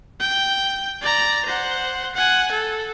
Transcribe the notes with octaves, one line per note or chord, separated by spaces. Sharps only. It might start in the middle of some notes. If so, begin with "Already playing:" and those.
G5
D5 A#5
C5 F#5
F#5 G#5
A4